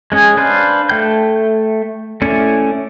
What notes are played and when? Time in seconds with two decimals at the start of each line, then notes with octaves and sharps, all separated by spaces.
0.12 G#3 C#4 G#4
0.37 D4 B4 C5 F5
0.89 A3 G5 G6
2.22 A3 C#4 E4 D5